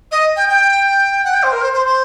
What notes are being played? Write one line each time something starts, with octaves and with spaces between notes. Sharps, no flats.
D#5
G5
G5
F#5
G5
C5
A#4
C5
C5
C5